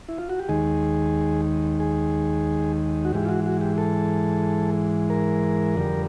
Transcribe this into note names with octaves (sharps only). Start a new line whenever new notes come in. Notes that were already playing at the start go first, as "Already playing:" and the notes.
E4
F4
F#4
G4
D#2 D#3 G#3 G#4
G#4
F#4
G#2 E3 G#3 G4
F4
F#4
F#4
G4
A4
A#4
F2 D3 G3